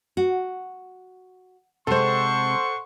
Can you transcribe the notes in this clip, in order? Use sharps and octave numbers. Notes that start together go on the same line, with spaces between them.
F#4
C3 G#3 A4 C5 F#5 C6 C#6